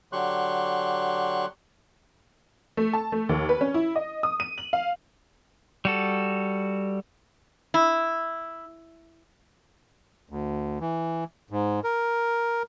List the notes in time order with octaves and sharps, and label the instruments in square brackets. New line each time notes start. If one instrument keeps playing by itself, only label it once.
[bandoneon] D3 F#3 G4 C6 C#6 F#6
[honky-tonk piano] A3
A5
A3
D#2
B4
C#4
E4
D#5
D#6
D#7
F#7
F5
[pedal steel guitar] G3 F#4 A4
[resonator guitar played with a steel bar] E4
[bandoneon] D2
E3
G#2
A#4